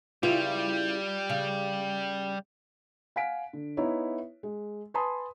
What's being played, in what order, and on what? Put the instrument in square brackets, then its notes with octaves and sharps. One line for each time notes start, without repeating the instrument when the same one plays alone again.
[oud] C#3 E4 B4 [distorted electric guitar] G3 [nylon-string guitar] F4
[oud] C#3
[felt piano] F5 F#5 G#5 B6 D7
D3
B3 D#4 E4 C#5 E5
G#3
B4 G#5 A5 B5 C6 D#6